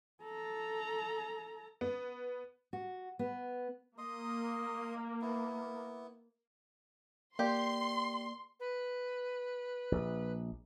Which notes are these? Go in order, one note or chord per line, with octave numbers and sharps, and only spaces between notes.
A4 A#5
B3
F#4
B3
A#3 D#5 C6 D#6
B3 E4
A#3 G4 D5 C6
B4
A#1